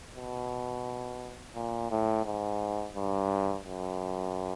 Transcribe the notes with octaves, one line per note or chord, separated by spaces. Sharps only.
B2
A#2
A2
G#2
G2
F#2